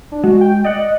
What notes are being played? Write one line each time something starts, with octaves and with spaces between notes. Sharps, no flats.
D4
G#3 F#4
G5
D5 D#5 F#5